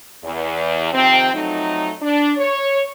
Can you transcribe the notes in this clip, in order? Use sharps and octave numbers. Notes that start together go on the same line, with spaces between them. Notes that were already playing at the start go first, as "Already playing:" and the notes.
E2
C3 D#3 F3 C4
F2 F#3 A3 D#4
D4
C#5